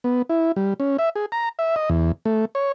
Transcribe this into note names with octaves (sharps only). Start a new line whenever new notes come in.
B3
E4
G3
C#4
E5
G#4
A#5
E5
D#5
E2
A3
C#5